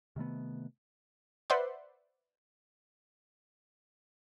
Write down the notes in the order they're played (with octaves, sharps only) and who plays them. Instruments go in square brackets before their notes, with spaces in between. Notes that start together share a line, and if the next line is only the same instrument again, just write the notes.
[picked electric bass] C3 D#3 A3 B3
[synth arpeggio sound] B4 C5 D5 E5 F#5 C6